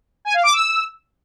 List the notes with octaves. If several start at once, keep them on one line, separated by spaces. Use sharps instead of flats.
G#5
F5
D6
E6